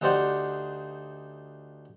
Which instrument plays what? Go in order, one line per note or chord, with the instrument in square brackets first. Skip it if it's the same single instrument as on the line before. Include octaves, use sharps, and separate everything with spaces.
[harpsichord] D2 D#4 G4 C5 D5 F#5